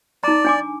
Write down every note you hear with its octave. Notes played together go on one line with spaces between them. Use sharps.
D#4 D5 A#5
D4 G#5 D6